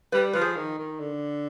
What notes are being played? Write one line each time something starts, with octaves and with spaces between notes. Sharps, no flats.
G3 B4 D5
F3 B4
G#4 C5
D#3
D#3
D3